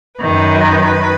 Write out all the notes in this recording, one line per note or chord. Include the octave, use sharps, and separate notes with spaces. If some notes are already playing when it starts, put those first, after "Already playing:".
F#2 D#3 B4